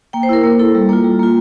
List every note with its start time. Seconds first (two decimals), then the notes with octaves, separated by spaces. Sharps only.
0.13 A#3 G5
0.23 C5
0.29 E4 A#4
0.43 A#3
0.59 E4 A4
0.75 G3
0.89 A#3 F4
1.04 G3
1.20 A#3 F4